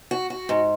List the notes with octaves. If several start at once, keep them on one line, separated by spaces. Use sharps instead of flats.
F#4
F#4
G#2